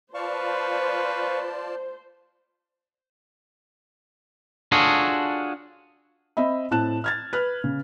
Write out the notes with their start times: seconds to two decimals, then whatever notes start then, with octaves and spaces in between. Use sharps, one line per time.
0.14 F4 B4 C5 D5 F5 A5 C#6
4.72 D4 F4 F#4 G#4 A4 C#5
6.37 C4 D#5 E5 B5
6.71 A2 C4 A5 F#6 E7
7.04 F6 G#6 A6
7.33 B4 F6
7.64 C#3